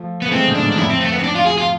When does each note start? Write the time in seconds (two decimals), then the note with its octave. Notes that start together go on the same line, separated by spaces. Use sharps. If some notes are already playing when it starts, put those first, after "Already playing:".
Already playing: F3 A3
0.22 B3
0.28 A3
0.32 E3 G#3 C4
0.48 B2 D3
0.55 D4
0.62 G#2 B2
0.72 D4
0.77 F2 A2 E4
0.90 C4
1.01 A3
1.12 B3
1.19 C4
1.24 D4
1.35 F4
1.46 G#4
1.58 F4